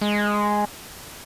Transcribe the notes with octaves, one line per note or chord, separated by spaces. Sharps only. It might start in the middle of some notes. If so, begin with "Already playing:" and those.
G#3